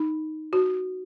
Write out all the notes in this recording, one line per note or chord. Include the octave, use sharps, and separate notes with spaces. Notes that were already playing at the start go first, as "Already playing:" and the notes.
Already playing: D#4
F#4